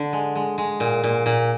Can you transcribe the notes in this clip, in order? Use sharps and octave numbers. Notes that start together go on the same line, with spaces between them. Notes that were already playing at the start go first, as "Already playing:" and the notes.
Already playing: D3
G#3
G#3
G#3
A#2
A#2
A#2